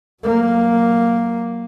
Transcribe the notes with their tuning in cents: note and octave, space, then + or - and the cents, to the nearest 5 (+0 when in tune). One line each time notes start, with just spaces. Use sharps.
F#3 +0 A#3 +0